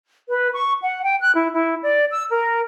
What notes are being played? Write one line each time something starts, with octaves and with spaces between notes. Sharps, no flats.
B4
C#6
F#5
G5
F#6
E4
E4
D5
E6
A#4